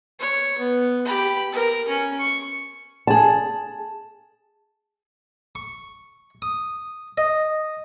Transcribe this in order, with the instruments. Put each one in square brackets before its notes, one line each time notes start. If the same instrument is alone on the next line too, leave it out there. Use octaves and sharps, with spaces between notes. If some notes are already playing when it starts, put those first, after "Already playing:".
[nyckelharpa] C#5
B3
G4 B5
A#4
C#4
C#6
[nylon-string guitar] G#4 A5
[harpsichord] C#6
D#6
D#5